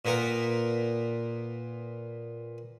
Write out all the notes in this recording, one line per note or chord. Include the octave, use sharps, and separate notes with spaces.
A#2 B3 A#4